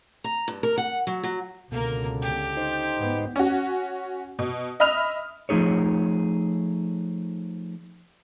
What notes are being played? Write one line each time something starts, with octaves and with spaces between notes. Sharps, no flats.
A#5
G2
A#4
F#5
F#3
F#3
C#2 B2 D3 A#3 A#4
G4
D#4 C5
G#2 B3
C#4 F#4
B2
D#5 E5 B5 D#6 F6 F7
F3 A3 D#4 G#4 C#5